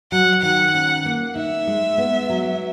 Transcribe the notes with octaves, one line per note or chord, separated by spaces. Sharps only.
F#3 F#5
D#3 F#5
C#4
A#3
D#4 E5
G#3
B3
F#3